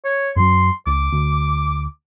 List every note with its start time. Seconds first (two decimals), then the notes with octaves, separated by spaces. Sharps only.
0.05 C#5
0.36 F#2 F#3 C6
0.87 C#2 D6
1.12 D2